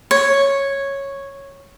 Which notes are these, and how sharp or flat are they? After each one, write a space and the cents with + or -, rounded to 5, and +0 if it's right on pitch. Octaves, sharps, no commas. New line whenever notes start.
C#5 -5